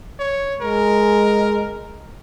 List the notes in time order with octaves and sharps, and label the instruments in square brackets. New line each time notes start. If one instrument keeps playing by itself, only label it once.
[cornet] C#5
[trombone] G#3 [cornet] A#4